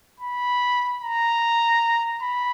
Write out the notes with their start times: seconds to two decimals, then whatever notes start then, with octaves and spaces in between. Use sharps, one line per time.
0.20 B5
1.02 A#5
2.22 B5